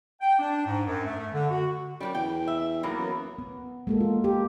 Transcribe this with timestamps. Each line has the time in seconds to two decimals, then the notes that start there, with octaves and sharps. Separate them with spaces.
0.21 G5
0.39 D4
0.67 G#2
0.86 F#2
1.05 A3
1.34 D3
1.50 F#4
2.00 F#2 G3 F#4 G4
2.15 E2 G5
2.47 E5
2.83 B1 E3 A#3 B3
2.98 F#2
3.38 B3
3.87 G#3 A#3 A4
4.01 F4
4.24 G4